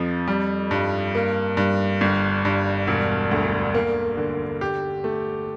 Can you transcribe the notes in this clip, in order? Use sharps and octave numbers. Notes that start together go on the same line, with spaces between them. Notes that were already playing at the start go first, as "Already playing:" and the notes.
Already playing: F2 F3
G3
G2
A#3
G2
G1
G2
E1
D2
A#3
D3
G4
A3